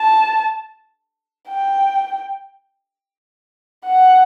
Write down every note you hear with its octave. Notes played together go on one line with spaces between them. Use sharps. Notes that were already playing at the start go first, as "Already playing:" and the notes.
Already playing: A5
G5
F#5